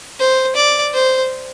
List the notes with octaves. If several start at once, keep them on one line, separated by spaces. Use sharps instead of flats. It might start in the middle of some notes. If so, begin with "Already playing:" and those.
C5
D5
C5